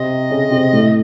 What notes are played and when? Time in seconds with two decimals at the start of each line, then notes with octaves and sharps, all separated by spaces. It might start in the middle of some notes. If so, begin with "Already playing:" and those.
Already playing: C3 C4 D#5
0.30 C#3 C#4
0.51 C3 C4
0.73 A2 A3